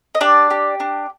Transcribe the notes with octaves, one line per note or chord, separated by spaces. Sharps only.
D#5
D4 G4 D5
G4
D4